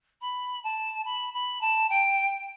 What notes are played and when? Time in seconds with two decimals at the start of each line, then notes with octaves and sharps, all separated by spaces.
0.21 B5
0.63 A5
1.05 B5
1.33 B5
1.61 A5
1.90 G5